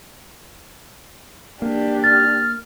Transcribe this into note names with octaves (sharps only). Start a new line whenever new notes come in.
A#3 D4 G4
F6 A6